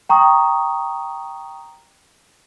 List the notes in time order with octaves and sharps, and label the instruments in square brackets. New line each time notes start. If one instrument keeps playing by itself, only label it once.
[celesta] G5 A#5 C#6 D#6